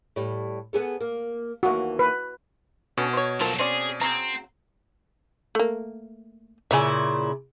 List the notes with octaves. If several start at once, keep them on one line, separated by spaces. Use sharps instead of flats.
A2 G3
B3 G#4 A4
A#3
D#2 E3 A#3 F#4
B4
B2 D3 B3 C#4
C5 C#5
F3 F#3 A#3 A4
C4 C#4 G#4 D5
C#3 F#3 C4 A#5
A3 A#3
A#2 C#3 E4 E5 G#5